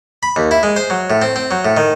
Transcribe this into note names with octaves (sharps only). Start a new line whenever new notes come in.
B5
D#2
E4
G#3
C5
F#3
A2
C4
C4
F#3
A2
D#3